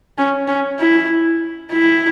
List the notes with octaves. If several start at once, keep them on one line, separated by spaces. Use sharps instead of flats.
C#4
C#4
E4
E4